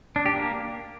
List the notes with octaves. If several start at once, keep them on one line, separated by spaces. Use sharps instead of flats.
D4
G4
A#3